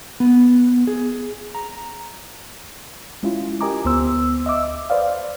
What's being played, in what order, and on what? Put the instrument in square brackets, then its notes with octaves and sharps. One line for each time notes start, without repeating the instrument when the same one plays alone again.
[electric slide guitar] B3
G#4
A#5
[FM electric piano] G#3 C#4 E4 F4
G4 A#4 D#5 G#5 A#5 D6
D2 B3 C5 E6
D#5 E5 D6 E6
B4 C5 D5 F5